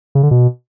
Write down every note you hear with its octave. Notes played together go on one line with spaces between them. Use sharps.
C#3
D3
B2